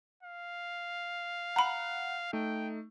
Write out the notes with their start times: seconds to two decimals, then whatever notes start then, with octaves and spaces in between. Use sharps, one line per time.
0.23 F5
1.56 F#5 A#5 B5
2.33 A3 D#4 G5